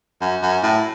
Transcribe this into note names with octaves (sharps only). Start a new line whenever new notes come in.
F#2
F#2
A2